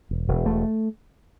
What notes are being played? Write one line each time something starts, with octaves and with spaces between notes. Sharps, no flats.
E1
E1
E1 A3